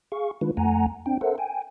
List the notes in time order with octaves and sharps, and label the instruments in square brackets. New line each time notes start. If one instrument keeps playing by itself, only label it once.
[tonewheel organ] G#4 F5 C#6
D#3 G#3 D4 F4 B4
F2 A3 F#5 G#5 A#5
C4 D4 G5
A4 A#4 C5 E5 F#5
G5 G#5